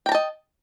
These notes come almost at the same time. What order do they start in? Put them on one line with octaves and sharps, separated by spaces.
G5 A#5 A5 D#5